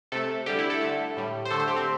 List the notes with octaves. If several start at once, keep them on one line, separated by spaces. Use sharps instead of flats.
C3 A3 A4
D3 G3 G4
E4
A4
D3 A3
A2 G3
C5
D3 A3 A4
C5
G4
C4